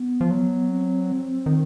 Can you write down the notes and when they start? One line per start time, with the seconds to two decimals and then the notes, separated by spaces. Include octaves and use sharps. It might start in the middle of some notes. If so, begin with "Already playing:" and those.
Already playing: B3
0.21 F3
0.31 F#3
0.69 C4
1.46 D#3